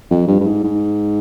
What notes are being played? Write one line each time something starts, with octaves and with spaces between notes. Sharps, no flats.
F2
G2
G2
G#2
G#2